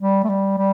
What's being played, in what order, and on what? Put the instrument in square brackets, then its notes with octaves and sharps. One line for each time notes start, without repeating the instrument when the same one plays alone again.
[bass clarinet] G3
A3
G3
G3